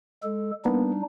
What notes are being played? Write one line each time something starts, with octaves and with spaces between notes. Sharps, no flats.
G#3 A4
G3 A#3 B3 D4 D#4